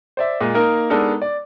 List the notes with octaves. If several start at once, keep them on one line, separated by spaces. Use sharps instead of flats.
C5 D5 E5
A#2 G#3
A#3 D#4 A#4
G#3 B3 D4 D#4 A4 A#4
D5